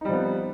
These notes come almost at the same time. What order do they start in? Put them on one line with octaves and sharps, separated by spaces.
D#4 G3 F3 B3 C4